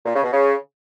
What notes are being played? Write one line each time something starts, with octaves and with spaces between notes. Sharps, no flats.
A#2
C#3
B2
C#3